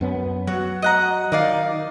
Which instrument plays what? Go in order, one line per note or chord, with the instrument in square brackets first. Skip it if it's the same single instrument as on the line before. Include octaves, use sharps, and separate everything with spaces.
[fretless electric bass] F#2 B3 C#4
[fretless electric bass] F#3 [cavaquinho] F#4
[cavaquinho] D#5 F#5 A#5
[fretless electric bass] D#3 [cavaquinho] D#4 D5 F5